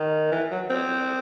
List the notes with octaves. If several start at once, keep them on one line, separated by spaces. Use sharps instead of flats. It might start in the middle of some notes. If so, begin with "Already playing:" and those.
Already playing: D#3
E3
F#3
C4